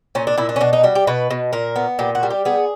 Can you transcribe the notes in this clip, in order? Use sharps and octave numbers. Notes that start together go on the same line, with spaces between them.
A#2 C#4
D4
A#2 E4
D4
C#4
B2 D4
D#4
G3 F#4
G4
B2 B4
B2
A#2 A#4
B3
A#2 G4
F#4
G3
G4
B3 G#4